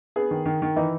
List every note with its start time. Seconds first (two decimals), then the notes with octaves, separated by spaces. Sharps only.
0.16 B3 G#4
0.31 D#3
0.46 D#3
0.62 D#3
0.76 E3 D#4